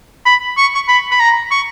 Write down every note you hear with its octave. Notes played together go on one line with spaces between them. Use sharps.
B5
C#6
C#6
B5
B5
A#5
C#6